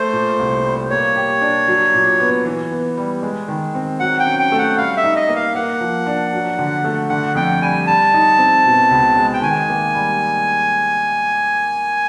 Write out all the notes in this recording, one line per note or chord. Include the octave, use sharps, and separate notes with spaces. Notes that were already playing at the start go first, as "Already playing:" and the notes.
Already playing: A3 C5
A#2
C2
G3
A#3 C#5
G4
D4
F#3
A#2
B3
E3
B3
G3
G#3
D#3
C4
F#3 F#5
G5
C#4
G5
A3
F#5
G3 F5
E5
D#4
D#5
A#3
F5
A#3 F#5
F3
D4
F#3
D3
A3
D3 F#5
F2 G5
G3 G#5
G3 A5
D#4
C4
B2
C#2
G#3
G5
D#3 G#5
A#3
G3